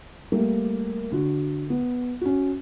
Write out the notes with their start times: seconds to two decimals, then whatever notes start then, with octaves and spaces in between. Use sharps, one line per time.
0.32 G3 A3 A#3
1.12 D3 F#4
1.70 B3
2.21 C#4 F#4